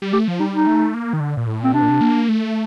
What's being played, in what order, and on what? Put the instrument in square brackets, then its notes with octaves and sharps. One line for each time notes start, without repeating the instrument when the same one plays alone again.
[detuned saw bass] G3
[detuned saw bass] A3 [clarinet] G4
[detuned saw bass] F3
[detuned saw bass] G3 [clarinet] D#4
[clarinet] D#4
[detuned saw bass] A3
A#3
D#3
D3
A#2
A2
[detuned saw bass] A#2 [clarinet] C4
[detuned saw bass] C3 [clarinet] D4
[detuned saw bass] A#2
C3
A#3
A3